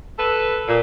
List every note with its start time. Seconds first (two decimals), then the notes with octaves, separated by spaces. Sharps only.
0.18 A4 B4
0.68 A#2